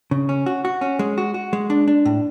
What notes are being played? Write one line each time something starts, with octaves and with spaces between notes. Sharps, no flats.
C#3
C#4
F#4
F#4
C#4
G#3
F#4
F#4
G#3
D4
D4
A2